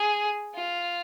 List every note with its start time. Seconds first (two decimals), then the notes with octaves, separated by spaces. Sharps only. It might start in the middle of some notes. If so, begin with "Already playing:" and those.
Already playing: G#4
0.55 F4